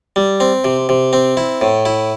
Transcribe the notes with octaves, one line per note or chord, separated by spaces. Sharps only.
G3
C4
C3
C3
C4
E4
A2
E4